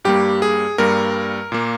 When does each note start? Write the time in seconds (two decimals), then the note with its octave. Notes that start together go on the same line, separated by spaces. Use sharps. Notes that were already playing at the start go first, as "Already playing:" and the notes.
0.05 G2 G3 A#3 G4
0.42 G#4
0.78 G2 G3 A#3 A#4
1.52 A#2 A#3